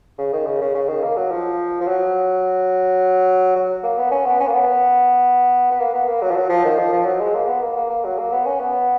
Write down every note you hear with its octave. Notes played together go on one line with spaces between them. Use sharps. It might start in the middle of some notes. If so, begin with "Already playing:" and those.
C#3
D#3
C#3
C#3
C#3
D#3
A#3
F#3
F3
F3
F#3
F#3
A#3
B3
C#4
B3
C#4
A#3
B3
B3
A#3
B3
A#3
F#3
F3
F#3
F3
D#3
F3
F3
F#3
G#3
A#3
B3
A#3
A#3
A#3
F#3
A#3
B3
C#4
B3